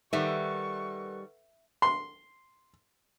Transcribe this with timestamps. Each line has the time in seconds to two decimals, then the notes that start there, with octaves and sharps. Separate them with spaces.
0.13 D#3 G3 A4 B4 E5 F#5 C#6
1.82 C6